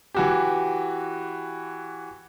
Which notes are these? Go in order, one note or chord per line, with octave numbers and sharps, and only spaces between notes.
E3 F#4 G4